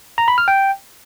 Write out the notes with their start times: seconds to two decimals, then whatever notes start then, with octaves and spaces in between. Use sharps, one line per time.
0.18 A#5
0.28 B5
0.38 F6
0.48 G5